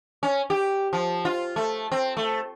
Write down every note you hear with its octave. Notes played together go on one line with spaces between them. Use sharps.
C#4
G4
F3
F4
A3
C4
A3